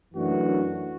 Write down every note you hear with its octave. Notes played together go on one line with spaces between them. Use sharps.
F#2 E3 A3 D4 F#4